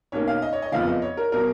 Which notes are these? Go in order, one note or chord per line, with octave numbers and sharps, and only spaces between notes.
B1 B2 A#3 C#4 C#5
F5
D#5
C#5
D#5
F#1 F2 F3 B3 F5
D#5
C#5
A#4
B2 F#3 A#4